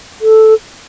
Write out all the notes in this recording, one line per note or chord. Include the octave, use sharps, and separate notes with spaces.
A4